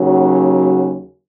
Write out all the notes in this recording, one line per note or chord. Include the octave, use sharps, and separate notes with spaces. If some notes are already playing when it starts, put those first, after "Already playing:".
Already playing: D#2 C#3 F#3